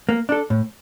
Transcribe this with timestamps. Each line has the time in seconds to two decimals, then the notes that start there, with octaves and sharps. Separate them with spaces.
0.09 A#3
0.29 D4 A4
0.50 A2